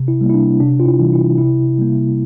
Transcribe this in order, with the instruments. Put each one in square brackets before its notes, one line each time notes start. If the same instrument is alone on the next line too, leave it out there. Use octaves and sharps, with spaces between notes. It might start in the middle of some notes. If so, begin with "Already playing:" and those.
Already playing: [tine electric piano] C3
E4
G3 A#3
E4
D4
C3 D4
F4
E4
E3 G3
E4
C3 E4
G3 A#3